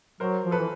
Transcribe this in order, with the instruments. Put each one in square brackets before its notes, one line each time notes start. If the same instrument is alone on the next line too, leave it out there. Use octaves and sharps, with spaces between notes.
[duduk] F#3 [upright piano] A#4 C5
[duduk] F3
[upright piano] A4 B4
[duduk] E3